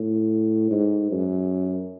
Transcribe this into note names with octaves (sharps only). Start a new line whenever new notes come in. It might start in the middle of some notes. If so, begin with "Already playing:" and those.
Already playing: A2
G#2
F#2